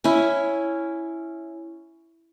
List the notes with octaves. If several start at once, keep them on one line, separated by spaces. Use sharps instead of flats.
C#4 E4